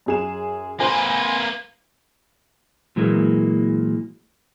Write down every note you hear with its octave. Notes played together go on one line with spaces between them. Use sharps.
F#2 G#4 E7
A#3 B4 C5 G#5
A#2 E3 F#3 G#3 A#3